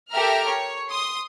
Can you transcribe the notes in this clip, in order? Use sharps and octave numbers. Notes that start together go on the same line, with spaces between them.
G4 A4 A#4 E5 A#5 F6
C#5
C6 D#6